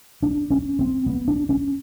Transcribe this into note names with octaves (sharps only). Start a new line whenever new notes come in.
D4
C#4
C4
B3
D4
C#4